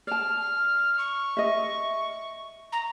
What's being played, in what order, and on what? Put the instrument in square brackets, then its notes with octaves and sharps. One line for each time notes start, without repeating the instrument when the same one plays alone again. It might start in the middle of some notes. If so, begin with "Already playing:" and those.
[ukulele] D5 A5 [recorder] F6
[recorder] C#6
[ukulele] D#5 E5
[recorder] A#5